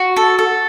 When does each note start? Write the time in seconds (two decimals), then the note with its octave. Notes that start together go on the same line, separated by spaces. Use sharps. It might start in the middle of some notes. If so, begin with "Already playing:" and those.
Already playing: F#4
0.16 A4
0.39 A4